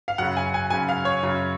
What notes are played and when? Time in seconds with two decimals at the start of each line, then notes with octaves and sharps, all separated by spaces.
0.08 F5
0.18 F#2 C#3 F#5
0.37 G#5
0.54 G#5
0.70 F#2 C#3 G#5
0.89 F5
1.05 C#5
1.23 F#2 C#3